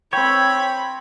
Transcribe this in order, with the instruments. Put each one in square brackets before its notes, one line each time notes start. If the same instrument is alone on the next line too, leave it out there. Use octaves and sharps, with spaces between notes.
[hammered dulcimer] C4 G5 [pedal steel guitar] C#5 [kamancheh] B5